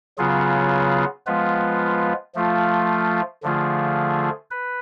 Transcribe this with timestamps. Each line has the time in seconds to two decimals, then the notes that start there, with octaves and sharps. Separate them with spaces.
0.18 C#3 F#3 B3 F4 G#4
1.27 F3 G#3 B3 F4 B4
2.35 F3 A3 F4
3.43 D3 F3 A3 F4 G#4
4.51 B4